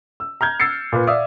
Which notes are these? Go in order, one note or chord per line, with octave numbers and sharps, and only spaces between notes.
E6
A#5 F6 G6 G#6
E6 A6 C7 C#7
A#2 B4
D5 E5 F5 D#6 E6